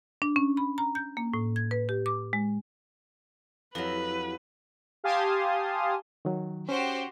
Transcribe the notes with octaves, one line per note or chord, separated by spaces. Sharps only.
D4
C#4
B5
A#5
G6
A#3
A2
G#6
B4
G4
D6
G#3
F2 F#3 E4 G4 B4
G4 F5 G#5 A5 C6 D#6
D#3 F#3
C#4 F#4 G4 C5